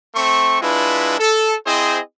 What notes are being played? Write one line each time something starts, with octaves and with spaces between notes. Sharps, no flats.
A3 C4 C#6
G#3 D4 E4 F4 B4
A4
C4 E4 G#4 C5 D#5